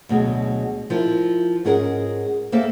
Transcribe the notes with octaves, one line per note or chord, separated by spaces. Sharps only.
D2 B2 F#3 G#3 A4
F3 E4 A#4
G#2 C#4 G#4 A#4 D5 F#5
A#3 C4 A4 C5 E5 G5